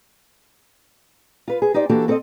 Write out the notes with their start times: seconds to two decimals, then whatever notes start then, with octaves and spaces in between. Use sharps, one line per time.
1.48 F4 B4
1.62 G#4
1.74 D#4 G4 C5 D5
1.89 E3 A#3 D4 F#4 G4 A4
2.08 C4 A4 C5 D5 D#5